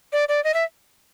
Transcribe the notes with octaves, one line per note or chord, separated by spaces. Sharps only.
D5
D5
D#5
E5